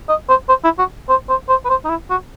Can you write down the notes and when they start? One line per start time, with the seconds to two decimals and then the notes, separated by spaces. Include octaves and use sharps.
0.09 D#5
0.29 C5
0.49 C5
0.64 E4
0.79 F#4
1.09 C5
1.29 C5
1.49 C5
1.65 B4
1.69 C5
1.85 D#4
1.89 E4
2.10 F#4